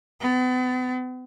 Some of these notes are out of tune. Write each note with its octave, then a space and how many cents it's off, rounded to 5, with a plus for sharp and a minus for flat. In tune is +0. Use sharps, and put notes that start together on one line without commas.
B3 +40